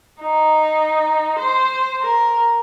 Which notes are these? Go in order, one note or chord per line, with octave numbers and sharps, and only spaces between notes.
D#4
C5
A#4